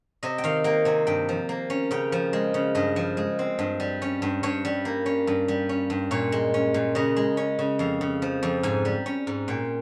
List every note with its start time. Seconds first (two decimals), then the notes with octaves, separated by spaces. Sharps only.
0.23 C3 D#5
0.38 G5
0.44 D#3 F5
0.64 A#3 G5
0.85 C3 G#5
1.07 G2 G5
1.29 F3
1.49 A#3
1.70 C#4
1.91 C#3 G5
2.12 F3
2.33 G#3
2.54 C#3
2.75 G2 D#5
2.96 F3
3.17 G#3
3.39 C4
3.59 G2
3.80 G3
4.02 C#4
4.22 G2
4.43 G2 C#5
4.65 G3
4.85 A#3
5.06 C#4
5.27 G2
5.48 G3
5.69 C#4
5.90 G2
6.11 A#2 C#5
6.32 G#3
6.54 C#4
6.74 A#2
6.95 C#3 D#5
7.17 G#3
7.37 C#4
7.59 C#3
7.79 F2 F5
8.01 C#3
8.22 F3
8.43 F2
8.63 G#2 G#5
8.85 G3
9.06 C#4
9.27 G#2
9.48 A#2 G5